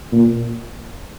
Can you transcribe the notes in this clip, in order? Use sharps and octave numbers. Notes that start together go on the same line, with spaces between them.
A#2